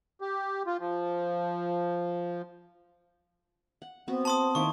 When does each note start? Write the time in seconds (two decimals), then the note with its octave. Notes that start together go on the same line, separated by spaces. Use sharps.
0.21 G4
0.66 F4
0.80 F3
3.82 F#5
4.08 B3 C4 F#4
4.25 A5 C6 D#6
4.55 D#3 A#3 E4 C#6